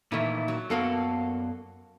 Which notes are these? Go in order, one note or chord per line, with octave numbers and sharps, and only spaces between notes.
A#2 D#3 E3 A3 E4
F#3
F#2 A#3 B3 F#4 A4 F5